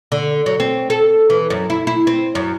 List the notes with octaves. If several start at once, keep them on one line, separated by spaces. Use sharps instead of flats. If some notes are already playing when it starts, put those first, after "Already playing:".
D3
F#3
C4
A4
E3
F#2
E4
E4
C4
F#2